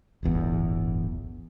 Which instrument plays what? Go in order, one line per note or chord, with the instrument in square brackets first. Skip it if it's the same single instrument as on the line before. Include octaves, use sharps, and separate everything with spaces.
[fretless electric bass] D1 G1 E2